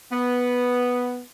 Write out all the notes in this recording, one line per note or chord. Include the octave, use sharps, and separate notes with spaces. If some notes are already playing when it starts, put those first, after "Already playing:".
B3